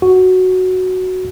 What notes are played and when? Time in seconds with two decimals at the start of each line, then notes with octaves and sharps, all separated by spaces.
0.02 F#4